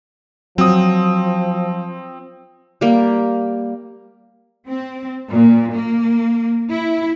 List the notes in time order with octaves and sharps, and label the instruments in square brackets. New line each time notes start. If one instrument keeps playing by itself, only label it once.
[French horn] F3 [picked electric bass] F#3 [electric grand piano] C4 D#6
[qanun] G3 A#3
[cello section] C4
A#2
A#3
E4